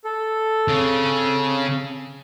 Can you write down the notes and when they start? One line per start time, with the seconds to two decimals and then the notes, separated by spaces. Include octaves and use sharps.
0.05 A4
0.68 C#3 C4